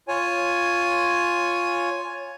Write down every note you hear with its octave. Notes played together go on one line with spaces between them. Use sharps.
F4 C#5 G#5